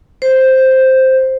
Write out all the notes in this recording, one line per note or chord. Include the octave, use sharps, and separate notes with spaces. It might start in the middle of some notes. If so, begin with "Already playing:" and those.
C5